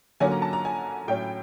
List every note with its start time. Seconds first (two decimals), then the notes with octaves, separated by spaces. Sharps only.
0.20 D3 F#3 A#3 C#4 G#5
0.31 A#5
0.42 A5
0.53 A#5
0.65 G#5
1.08 A2 F#3 A3 C#4 G5